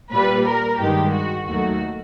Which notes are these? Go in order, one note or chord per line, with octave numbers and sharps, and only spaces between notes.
A#2 G3 B4
A#4
G2 D#3 G#3 G4
F#4
D#2 D#3 F#3 A3 F#4